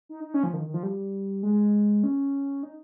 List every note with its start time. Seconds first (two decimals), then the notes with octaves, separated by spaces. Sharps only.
0.09 D#4
0.24 D#4
0.34 C#4
0.44 F3
0.54 D#3
0.64 D#3
0.74 F3
0.83 G3
1.43 G#3
2.03 C#4
2.63 D#4